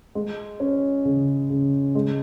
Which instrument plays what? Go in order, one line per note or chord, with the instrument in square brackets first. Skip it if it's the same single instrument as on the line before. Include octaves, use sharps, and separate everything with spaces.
[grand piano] G#3
C#4
C#3
C#3
G#3